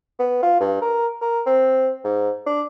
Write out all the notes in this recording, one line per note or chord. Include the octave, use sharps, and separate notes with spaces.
B3
F4
G2
A#4
A#4
C4
G#2
D4